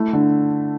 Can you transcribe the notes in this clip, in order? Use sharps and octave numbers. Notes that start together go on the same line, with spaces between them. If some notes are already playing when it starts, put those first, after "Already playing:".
Already playing: A3 E4
D3